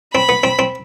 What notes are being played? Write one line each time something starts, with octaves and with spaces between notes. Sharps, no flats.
C4 B5
B3
C4
C4